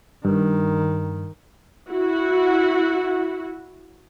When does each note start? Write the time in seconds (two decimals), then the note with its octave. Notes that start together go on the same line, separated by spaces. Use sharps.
0.25 G2 D#3
1.89 E4 F#4